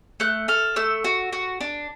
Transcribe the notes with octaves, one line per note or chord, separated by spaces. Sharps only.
A3 F#6
A4 F6
A3 E6
F#4
F#4
D4